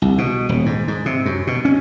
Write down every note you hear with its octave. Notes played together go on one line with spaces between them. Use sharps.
C2
B2
D#1
G#2
G#2
C3
F#2
B2
C#4